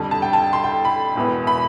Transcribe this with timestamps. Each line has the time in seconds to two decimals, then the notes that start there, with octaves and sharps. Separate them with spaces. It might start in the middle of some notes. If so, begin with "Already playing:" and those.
Already playing: F2 D3 G3
0.11 A5
0.22 G5
0.33 A5
0.53 C6
0.64 G5
0.85 B5
1.16 E1 E2 B2 B3
1.47 B5